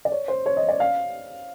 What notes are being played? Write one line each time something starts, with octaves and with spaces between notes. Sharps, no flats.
D5
C#5
C5
C#5
D#5
D5
F5